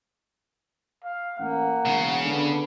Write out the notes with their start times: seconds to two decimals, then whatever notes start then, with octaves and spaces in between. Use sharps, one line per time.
1.04 F5
1.39 A1 A#3 F#5
1.85 E1 C#3
2.25 D3 B3 D4